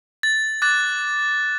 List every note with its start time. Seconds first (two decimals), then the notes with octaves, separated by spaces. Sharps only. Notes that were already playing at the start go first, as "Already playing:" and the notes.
0.23 A6
0.62 D6 F#6 A6